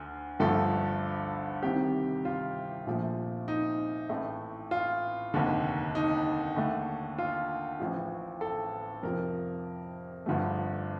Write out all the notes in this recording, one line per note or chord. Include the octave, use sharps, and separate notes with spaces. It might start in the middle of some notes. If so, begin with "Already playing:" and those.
Already playing: D2 D3
G1 G2 D3 F3 A3 A4
C2 C3 D#3 G4
F4
A#1 A#2 F3 A3
D#4
A1 A2 A3
F4
F1 D#2 D3
D#4
D#2 D3 A3
F4
A1 A2 F3
A4
F2 C3 F3 A#4
G1 G2 D3 F3 A3